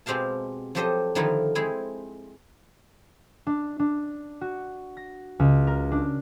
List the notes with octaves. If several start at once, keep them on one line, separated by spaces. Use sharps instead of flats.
B2 G#3 C4 G4 F5 A5
F3 F#3 G4 A4 C5 D#5
D3 D#3 F3 D#4 E4 A#4
G#3 C4 E4 G#4
D4
D4
F#4
A#6
C#2
A#4
D4